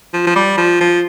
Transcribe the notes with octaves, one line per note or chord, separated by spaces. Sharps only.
F3
F3
G3
F3
F3